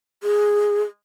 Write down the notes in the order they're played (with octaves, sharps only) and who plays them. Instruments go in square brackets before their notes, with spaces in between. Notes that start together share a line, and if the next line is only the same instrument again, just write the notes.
[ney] G#4